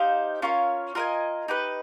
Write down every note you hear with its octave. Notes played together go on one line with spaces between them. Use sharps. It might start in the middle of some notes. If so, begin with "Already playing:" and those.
Already playing: D#4 G4 C5 F5
C#4 F4 A#4 C#5
F4 A#4 D#5 G#5
D#4 G4 B4